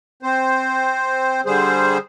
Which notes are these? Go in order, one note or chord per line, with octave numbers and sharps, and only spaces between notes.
C4 C5
D3 G3 G#4 C5